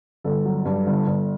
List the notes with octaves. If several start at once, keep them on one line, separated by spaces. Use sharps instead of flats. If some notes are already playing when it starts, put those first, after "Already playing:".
G1 A4
F#3
G2
G1
G1